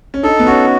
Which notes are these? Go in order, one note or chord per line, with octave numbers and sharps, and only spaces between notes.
C#4
D#4 A4
B3
C#4 F#4